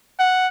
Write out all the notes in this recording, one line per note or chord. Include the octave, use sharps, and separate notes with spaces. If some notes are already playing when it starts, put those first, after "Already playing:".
F#5